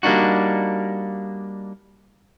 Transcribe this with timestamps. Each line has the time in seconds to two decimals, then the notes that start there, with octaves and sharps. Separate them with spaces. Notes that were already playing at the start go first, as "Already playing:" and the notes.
0.03 G3 A#3 D4 D#4 F#4